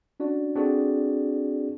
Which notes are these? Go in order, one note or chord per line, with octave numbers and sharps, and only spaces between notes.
C#4 D4 F#4 D5
C4 D4 F#4 G#4 A4 D5